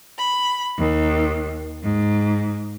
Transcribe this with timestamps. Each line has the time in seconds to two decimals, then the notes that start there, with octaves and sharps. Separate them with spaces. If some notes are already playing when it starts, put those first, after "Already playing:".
0.18 B5
0.76 D#2
1.81 G#2